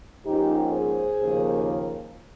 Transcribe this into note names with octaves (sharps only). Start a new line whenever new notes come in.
G#2 F3 A#3 C#4 D#4 G4
G#4 C5
D#2 C#3 F3 A#3